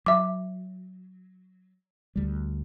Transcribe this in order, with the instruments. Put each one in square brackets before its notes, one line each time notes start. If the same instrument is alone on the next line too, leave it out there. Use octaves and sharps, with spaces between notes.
[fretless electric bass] F#3 [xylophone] E5 D6
[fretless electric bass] D2 G3